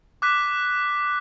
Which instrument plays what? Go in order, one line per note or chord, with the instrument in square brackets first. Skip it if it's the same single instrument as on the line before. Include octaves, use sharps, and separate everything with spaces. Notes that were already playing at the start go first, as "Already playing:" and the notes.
[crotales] D6 F#6 B6